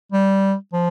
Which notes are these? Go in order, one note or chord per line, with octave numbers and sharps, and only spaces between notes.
G3
F3